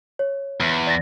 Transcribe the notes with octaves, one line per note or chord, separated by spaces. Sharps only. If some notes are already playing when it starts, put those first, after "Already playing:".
C#5
E2
D5 A6 A#6